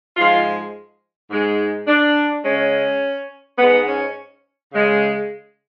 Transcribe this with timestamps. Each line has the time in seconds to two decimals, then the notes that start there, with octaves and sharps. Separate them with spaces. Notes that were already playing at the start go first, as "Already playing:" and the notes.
0.17 G#2 F3 G#3 F4
1.30 G#2 G#3
1.87 D4
2.44 C#3 G#3 C#4
3.58 G#2 G#3 B3
3.86 C#4
4.72 C#3 G#3